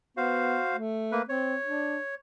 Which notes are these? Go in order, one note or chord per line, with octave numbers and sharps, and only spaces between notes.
B3 F#4 C5 F5
A3
A#3 B4
C4 C#5
D4